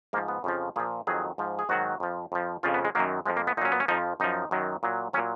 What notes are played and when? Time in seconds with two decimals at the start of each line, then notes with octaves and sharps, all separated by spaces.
0.13 G#2 A#3
0.17 F3
0.28 B3
0.44 F2 C#3 F3
0.76 A#2 F3 G#4
1.07 F2 D#3 F#3 G#4
1.38 G#2 F3
1.59 G#4
1.69 G#2 D#3 F#3 F#4
2.00 F2 F3
2.32 F2 F3
2.63 F2 C#3 F3 F4
2.74 B3
2.85 G#3
2.95 F#2 D#3 F#3 A#3
3.26 F2 F3 G#3
3.37 A#3
3.47 B3
3.57 A#2 D#4
3.62 F#3 C#4
3.72 B3
3.80 C#4
3.88 F2 F3 D#4
4.20 F#2 F3 D#4
4.51 F#2 D#3 F#3
4.83 A#2 F#3
5.13 F#3 C#4
5.17 A#2